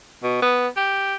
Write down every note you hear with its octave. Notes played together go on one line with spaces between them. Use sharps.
B2
B3
G4